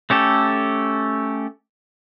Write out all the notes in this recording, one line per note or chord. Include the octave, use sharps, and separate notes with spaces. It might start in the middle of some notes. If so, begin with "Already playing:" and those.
A3 C#4 G4 A4